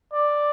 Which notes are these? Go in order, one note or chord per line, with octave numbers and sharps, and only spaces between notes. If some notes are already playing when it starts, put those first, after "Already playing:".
D5